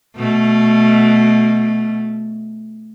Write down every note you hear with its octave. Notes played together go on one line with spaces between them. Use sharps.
B2 A3